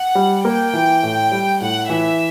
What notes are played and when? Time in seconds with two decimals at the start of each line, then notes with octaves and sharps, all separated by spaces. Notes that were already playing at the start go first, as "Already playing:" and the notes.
Already playing: F#5
0.15 G3
0.45 A#3 G5
0.73 E3
1.03 A2
1.32 G3
1.61 A2 F#5
1.89 E3 E5